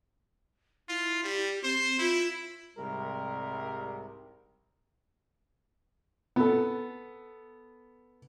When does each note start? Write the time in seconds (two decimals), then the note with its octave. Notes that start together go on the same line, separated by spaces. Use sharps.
0.89 E4 F4
1.24 G3 G4
1.64 C4 C5
1.99 E4 F4
2.77 C2 G#2 C3 G3 A#4
6.36 B3 A4